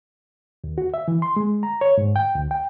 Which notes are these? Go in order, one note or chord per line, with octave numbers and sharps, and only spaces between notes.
D#2
F#4
E5
E3
C6
G#3
A#5
C#5
G#2
G5
D2
G5